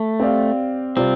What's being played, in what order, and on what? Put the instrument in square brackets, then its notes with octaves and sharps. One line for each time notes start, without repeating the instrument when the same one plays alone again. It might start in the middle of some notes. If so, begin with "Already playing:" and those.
Already playing: [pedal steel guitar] A3
[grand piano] C4 G4 D5 F5
[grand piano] C3 G3 F4 D5 [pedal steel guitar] C4